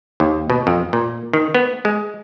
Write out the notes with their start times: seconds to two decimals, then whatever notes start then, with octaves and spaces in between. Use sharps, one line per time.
0.20 D#2
0.50 B2
0.67 F2
0.93 A#2
1.33 D#3
1.55 B3
1.85 G#3